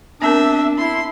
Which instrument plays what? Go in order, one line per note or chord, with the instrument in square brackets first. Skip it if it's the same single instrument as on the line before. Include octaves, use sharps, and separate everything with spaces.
[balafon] B3 C4 A#4 [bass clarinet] D4 [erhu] E5
[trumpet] E4 [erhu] C6